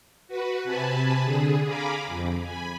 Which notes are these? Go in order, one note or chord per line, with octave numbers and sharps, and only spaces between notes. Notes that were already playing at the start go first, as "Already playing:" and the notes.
F#4 B4
C3 G#5 A5 B5
D3 G#4
F5 G#5 A#5 B5 D6
F2
G#5 B5